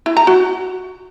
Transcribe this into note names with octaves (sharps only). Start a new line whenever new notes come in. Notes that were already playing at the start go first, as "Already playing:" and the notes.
E4
A#5
F#4